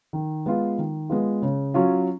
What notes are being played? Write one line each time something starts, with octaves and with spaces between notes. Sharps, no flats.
D#3
G#3 B3 F4
D#3
G#3 B3 F4
C#3
F#3 C#4 F4